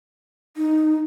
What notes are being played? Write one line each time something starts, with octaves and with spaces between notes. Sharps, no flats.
D#4